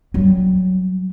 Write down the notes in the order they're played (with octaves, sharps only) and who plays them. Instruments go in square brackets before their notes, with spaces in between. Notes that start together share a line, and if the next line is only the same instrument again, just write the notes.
[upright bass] F#3 G3